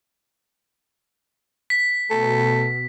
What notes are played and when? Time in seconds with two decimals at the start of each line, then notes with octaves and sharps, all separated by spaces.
1.70 B6
2.10 B2 A3